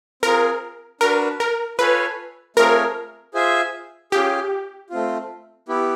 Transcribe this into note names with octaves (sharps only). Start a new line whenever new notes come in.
C4 F4 G#4 A#4
D4 F#4 A#4 B4
A#4
F4 A4 B4 C#5 F5 G#5
A3 C4 F4 G#4 A#4 C#5
F4 G#4 C5 E5 G#5
C#4 F4 G4 G#4
A3 C4 F4
B3 E4 G4